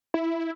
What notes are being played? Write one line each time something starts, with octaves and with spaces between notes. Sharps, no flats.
E4